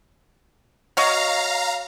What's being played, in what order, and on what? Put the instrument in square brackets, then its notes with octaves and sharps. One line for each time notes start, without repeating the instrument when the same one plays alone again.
[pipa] F#4 C#5 D#5 [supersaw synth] F5 A#5